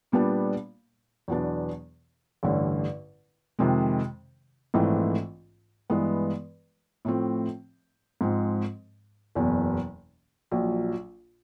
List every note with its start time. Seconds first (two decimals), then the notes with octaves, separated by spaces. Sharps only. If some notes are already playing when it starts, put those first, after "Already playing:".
0.12 A#2 G3 B3 D4
1.28 E2 B2 F#3 B3 D4
2.43 A1 G2 D3
3.59 F2 C3 D#3 G#3
4.74 A#1 G#2 E3 A3 C4
5.90 G2 E3 G#3 B3
7.05 A2 F3 A3 C4
8.21 G#2 F3 G#3 C4
9.35 F#1 E2 B2
10.51 A#1 A#2 F#3